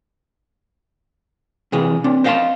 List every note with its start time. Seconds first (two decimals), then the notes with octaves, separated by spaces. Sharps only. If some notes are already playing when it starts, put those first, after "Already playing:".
1.72 C3 E3 G#4
2.04 C4 D4
2.24 C5 D#5 F5 G5 A5 C6